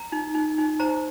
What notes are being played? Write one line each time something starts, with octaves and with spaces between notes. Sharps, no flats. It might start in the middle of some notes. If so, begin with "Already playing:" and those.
Already playing: A#5
D#4
D#4
D#4
C5 A#5